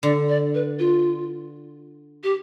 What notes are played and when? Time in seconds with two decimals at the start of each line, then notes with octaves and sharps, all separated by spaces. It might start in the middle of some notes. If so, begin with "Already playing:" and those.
0.03 D3 D5
0.29 D5
0.55 B4
0.79 F4
2.23 G4